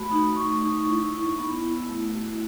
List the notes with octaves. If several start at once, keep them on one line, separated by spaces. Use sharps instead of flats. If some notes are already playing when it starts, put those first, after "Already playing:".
Already playing: A3 F#4 B5
D#4
A3 C#6
D#4
E4
E4
B3
E4
A3
F#4